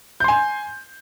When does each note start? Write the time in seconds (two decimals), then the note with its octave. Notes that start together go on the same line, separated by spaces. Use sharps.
0.20 G6
0.24 C6
0.28 G#5